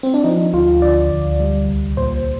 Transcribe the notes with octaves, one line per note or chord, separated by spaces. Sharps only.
C4
D4
F3 D#4
D2 F4
D3 D5
D2
G3
C2
A#2 C5